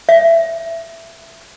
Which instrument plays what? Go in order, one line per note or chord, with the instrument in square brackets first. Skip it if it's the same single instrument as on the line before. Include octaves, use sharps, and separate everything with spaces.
[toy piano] E5